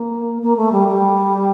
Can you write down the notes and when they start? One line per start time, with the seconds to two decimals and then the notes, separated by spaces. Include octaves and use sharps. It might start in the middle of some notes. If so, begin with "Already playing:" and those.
Already playing: A#3
0.42 A#3
0.57 A3
0.72 G3
0.88 G3